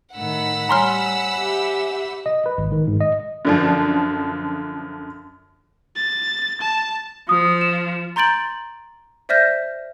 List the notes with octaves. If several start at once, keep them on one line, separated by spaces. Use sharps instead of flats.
A2 D#3 F#5 B5 E6
G3 C#5 G#5 A#5 C6 F6
G4 E5
D#5
B4
G#1
D#3
G#2
D#5
F#2 D3 F3
A6
A5
F3 D#6
E7
A#5 C6 G6 A6 D7 F#7
C5 D5 E5 F6 G6 A#6